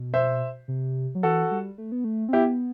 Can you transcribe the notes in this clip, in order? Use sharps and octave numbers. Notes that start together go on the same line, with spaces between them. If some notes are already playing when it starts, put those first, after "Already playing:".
Already playing: B2
C5 E5
C3
F#3
E3 F#4 A4
G3
A3
B3
A3
C4
B3 E4 G4